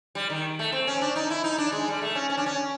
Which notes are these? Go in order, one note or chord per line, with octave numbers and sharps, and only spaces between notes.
G3
D#3
A3
C4
C#4
D4
D#4
E4
D#4
D4
G#3
G3
A3
C#4
C#4
D4
C#4